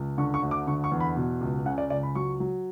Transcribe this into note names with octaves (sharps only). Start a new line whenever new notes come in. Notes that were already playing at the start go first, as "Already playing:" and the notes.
Already playing: C#2
D3 C#6
C#6
D2
D6
D3 C#6
C#6
E2
B5
B2
C#2
C#3 F#5
D5
C#2 D5
B5
F#3 C#6
F#3